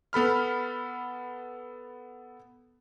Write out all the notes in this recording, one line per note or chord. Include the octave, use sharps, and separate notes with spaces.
B3 A4 B5 F6